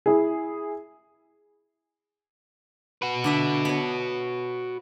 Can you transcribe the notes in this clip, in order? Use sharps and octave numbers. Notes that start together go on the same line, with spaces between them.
E4 G#4
F#4 B4
D3 D4 E5
B3 C#5